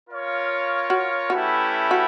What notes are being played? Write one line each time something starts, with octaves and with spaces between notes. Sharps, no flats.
F4 A#4 C#5 F5
F#4
A3 C#4 E4 F#4 G4 B4
F#4